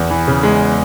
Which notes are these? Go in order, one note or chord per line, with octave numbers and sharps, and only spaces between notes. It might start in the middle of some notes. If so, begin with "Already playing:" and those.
Already playing: E2
E3
C#3
G#3